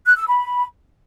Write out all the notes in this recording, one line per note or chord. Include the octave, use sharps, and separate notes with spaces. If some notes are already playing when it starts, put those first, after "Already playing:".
F#6
E6
B5